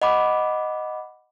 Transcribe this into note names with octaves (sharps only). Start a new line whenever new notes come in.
D#5 F#5 B5 D6